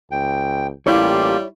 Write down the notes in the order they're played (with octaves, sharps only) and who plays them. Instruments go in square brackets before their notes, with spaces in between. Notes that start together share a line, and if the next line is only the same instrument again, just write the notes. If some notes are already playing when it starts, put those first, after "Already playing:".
[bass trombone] C#2 [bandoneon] G5
[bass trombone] A1 [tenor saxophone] G3 [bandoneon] A#3 F4 G4 [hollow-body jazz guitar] E4 C#5